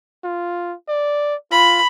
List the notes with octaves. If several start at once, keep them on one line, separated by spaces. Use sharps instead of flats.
F4
D5
F4 B5